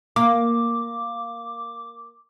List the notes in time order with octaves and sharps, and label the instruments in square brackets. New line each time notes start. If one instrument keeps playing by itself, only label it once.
[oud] A#3 [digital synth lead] D6